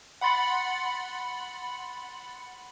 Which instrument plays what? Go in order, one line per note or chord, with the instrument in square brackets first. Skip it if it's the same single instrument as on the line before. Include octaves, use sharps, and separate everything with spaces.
[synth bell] F#5 B5 C6 A6 C#7 F#7